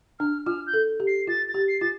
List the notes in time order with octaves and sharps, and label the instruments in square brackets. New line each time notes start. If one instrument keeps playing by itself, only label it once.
[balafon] D4 [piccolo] F6
[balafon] F4 [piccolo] F6
[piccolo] G6
[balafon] A4
G4
[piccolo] C7
[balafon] F4 [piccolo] A6
[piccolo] A6
[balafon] G4
[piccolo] C7
[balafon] F4 [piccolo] A6